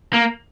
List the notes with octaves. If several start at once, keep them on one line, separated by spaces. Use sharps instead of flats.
A#3